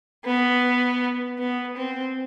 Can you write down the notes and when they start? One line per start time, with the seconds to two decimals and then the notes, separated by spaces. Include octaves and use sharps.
0.25 B3
1.39 B3
1.77 C4